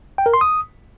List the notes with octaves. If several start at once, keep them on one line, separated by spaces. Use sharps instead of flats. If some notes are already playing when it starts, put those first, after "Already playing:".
G5
A#4
C6
D#6